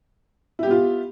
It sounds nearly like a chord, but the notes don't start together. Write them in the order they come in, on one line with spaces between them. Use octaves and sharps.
E4 G4 B3 F4